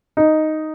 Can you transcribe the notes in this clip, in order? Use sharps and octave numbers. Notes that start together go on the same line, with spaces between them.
D#4